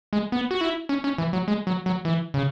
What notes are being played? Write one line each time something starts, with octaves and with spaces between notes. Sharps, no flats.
G#3
B3
F#4
E4
C#4
C#4
E3
F#3
G#3
F#3
F#3
E3
C#3